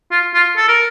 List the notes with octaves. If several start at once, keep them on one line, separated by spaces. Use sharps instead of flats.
F4
F4
A4
A#4